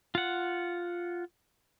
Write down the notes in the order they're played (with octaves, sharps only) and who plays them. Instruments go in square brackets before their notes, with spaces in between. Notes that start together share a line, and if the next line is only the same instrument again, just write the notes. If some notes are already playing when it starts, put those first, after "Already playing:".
[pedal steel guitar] F4 F#5